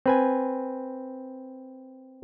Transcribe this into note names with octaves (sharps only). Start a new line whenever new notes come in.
C4 B4 G#5